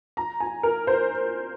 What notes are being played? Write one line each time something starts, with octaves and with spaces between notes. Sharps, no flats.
A#5
G#5
A#4
C5